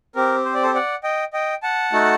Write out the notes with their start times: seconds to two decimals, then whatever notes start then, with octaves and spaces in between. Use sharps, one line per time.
0.15 C4 G4 A#4
0.45 C5
0.54 D5
0.63 A4 C5
0.74 D5 F#5
1.04 D#5 G5
1.33 D#5 G5
1.63 F#5 A5
1.92 A3 D#4 F#4 A4